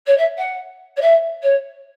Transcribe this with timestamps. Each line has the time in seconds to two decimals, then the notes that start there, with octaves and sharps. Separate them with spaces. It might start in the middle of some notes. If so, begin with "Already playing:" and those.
0.06 C#5
0.17 E5
0.38 F#5
0.96 C#5
1.01 E5
1.42 C#5